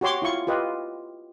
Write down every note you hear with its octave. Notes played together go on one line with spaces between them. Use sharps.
F#4 G4 C#5 C6 D6
E4 F4 C#6
F4 G4 B4 D#5